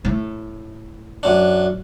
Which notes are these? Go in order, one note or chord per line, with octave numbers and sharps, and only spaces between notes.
A2
F#2 D4